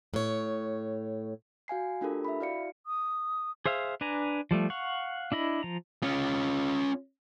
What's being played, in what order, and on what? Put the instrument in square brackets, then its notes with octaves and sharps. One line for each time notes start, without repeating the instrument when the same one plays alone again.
[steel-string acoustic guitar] A2 C#5
[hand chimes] F#4 F5 G#5 C7
A3 D4 F4 G4 A4 A#4
E5 B5
E4 F#4 D5 F5 C#7
[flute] D#6
[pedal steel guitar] G#4 C5 E5 F5
D4 B4 G#5 A#5
F3 G3 A3
F5 F#5 C#6
D4 E4 D#5 B5
F3 A#5
[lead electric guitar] C#4 F4